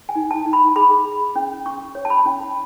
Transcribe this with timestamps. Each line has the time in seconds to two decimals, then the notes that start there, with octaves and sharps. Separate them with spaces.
0.09 G#5
0.15 D#4
0.31 A5
0.46 D#4
0.53 B5
0.76 G#4 B5
1.05 G#4
1.36 C#4
1.66 C#4 C#6
1.95 C#5
2.05 A5
2.10 B5
2.26 C#4